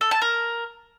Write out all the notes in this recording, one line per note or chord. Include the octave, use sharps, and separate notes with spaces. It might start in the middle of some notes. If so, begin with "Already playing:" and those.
A4
A5
A#4